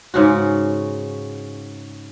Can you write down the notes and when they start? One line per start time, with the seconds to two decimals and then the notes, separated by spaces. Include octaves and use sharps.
0.14 G#2 C#3 F#4